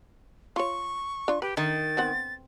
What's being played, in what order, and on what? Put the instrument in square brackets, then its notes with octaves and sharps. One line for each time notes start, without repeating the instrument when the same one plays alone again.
[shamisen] F4 C#5 [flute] C#6
[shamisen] D4 F4
[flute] G4 [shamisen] B4
[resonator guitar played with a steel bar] D#3 [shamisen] D#4 [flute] A6
[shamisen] B3 C4 F#5